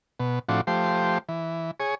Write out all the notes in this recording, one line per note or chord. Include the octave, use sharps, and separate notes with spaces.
B2
A2 F3 C4 D4 F#4
F3 A3 G4 C5
E3
G#4 C#5